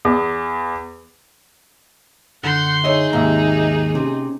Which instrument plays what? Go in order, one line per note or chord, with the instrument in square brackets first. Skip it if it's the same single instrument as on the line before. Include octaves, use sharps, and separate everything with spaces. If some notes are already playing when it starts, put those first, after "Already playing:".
[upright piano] E2
[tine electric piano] F#2 D3 [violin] F#5 G6 [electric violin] C6
[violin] D#4 G#4 [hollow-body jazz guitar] C#5 D#5 E5
[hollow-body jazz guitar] D#2 G#2 C3 [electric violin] A#3 [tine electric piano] E5 F5 A#5
[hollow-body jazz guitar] C3 [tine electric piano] C4 C#4